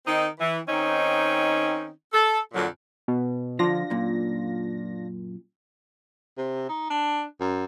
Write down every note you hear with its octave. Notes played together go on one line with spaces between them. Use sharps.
D#3 C4 D#4
E3
D#3 C4 C#4 D#4
A4
F2 A#2 D3 F3 F#3
B2
D3 F3 D4 F4 A#6
F#2 A#2
C3
D#4
D4
F#2